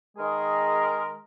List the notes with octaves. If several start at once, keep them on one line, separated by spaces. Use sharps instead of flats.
D#3 G#3 G#4 A#4